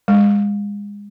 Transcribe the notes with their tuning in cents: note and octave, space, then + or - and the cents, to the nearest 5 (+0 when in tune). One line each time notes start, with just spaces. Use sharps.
G#3 -30